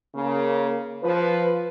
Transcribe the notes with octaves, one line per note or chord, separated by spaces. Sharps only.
C#3 A#3
F3 B4